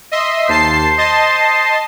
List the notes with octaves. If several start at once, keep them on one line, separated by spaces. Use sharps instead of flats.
D#5 E5 C6
D#2 C5 A5 C7
D#5 A5 C6